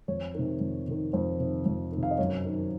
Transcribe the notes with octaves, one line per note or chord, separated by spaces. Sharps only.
F2 C#5
C3 D#3
F2
C3 D#3
F2 C5
C3 D#3
F2
D#3
C3
F5
D#5
F#2 C#5
D#3